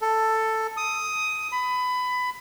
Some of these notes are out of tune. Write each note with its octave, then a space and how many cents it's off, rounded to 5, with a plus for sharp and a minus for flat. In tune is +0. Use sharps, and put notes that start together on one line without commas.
A4 +10
D#6 +10
B5 +20